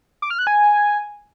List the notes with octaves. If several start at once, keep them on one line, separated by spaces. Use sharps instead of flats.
D6
F6
F#6
G#5